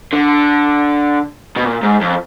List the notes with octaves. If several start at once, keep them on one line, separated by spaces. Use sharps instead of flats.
D3
B2
A#2
G#2
F2